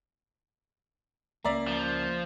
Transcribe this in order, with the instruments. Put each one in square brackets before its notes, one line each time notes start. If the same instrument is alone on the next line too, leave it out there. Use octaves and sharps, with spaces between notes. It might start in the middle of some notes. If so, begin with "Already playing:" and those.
[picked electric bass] C#2 F#3 C#4 [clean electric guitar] A#3 [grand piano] D5 E5 A#5
[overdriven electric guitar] F3